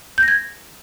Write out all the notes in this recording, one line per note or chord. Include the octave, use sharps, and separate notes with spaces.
G6
A#6
G#6